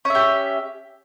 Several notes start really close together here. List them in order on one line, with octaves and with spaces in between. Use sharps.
C#4 E5 G4